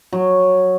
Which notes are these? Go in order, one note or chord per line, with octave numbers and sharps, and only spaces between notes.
F#3